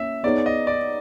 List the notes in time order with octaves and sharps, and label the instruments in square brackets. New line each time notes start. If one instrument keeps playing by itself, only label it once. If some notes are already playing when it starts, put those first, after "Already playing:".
Already playing: [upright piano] A#3 C#4 [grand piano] E5
[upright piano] B3 D#4 G#4 C#5 [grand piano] D5
[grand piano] D#5
D5